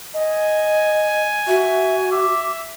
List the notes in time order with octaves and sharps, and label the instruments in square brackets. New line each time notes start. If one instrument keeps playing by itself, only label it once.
[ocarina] D#5 [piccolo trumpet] G#5
[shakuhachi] F#4 [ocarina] E5
[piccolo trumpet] E5 [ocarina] D6